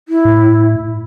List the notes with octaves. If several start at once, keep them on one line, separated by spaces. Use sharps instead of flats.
E4
A2